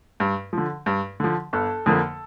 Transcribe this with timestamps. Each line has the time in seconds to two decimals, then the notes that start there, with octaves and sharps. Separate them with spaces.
0.20 G2
0.53 D3 F3
0.86 G2
1.20 D3 F3
1.53 G1 A4
1.86 F2 D3 F3 A#3